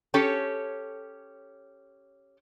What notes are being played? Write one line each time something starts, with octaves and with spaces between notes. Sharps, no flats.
C#4 G4 A4 C#5